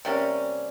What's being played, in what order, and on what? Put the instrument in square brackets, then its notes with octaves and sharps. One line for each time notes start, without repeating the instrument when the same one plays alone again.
[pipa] C3 G3 A#3 C#4